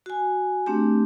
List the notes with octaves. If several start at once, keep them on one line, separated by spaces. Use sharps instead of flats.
F#4 G#5
A3 C4 D4 G4